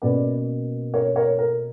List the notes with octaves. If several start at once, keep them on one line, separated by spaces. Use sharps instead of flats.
B2 A#3 C#4 B4 D5
A#4 C#5
A#4 C#5
A#4